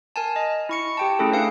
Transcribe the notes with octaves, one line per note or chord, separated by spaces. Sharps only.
A#4 G#5 A5
D#5
E4 C#6 C#7
G4 G5 A5
A3 C#4 E4 G#4 A4
D4 B4 F5 C#7